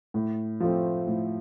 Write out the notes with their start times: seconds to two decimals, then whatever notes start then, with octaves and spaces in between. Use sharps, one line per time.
0.14 A2
0.60 F3 A3 C4
1.08 A2